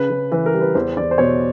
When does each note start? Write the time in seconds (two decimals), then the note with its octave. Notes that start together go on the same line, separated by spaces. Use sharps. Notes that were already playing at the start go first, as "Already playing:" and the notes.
Already playing: C#3 B4
0.10 C#3
0.32 E3 B4
0.46 A#4
0.54 G3
0.61 B4
0.75 E2 C5
0.97 E2 D5
1.11 C5
1.18 B2 C#5